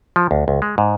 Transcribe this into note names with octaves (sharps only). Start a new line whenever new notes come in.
F3
D2
C#2
G#3
G#2